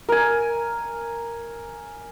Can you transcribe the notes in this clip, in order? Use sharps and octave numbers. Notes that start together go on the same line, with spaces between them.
A#4 G#5